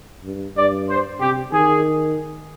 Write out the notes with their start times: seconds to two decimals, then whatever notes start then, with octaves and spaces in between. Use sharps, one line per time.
0.24 G2
0.56 G2 D5
0.89 C5
1.20 C3 G4
1.52 D#3 G#4